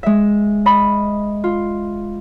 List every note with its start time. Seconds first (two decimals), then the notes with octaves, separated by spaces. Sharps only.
0.03 G#3 E5
0.66 D#5 B5
1.44 F4